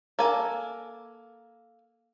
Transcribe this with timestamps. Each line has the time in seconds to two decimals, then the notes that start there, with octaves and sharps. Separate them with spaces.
0.19 A#3 A4 G#5